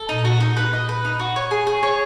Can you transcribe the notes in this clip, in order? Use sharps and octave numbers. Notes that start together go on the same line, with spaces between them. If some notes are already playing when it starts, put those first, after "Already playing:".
Already playing: A4
A#2 D#4
F#4
D#4
B4
D#5
B4
D#4
F#4
C#5
G#4
G#4
C#5